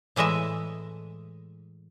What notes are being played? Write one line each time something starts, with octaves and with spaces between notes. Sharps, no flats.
A2 E3 G#3 D#5 E5